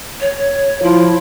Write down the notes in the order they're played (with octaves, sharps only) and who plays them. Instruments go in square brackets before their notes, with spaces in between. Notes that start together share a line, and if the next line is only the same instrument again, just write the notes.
[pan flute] C#5
[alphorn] F3 [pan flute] E4